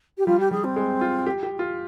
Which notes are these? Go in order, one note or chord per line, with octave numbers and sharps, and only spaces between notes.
G4
G3 F4
G4
G3 G#4
C4
G#3
F4
G4
G4
F4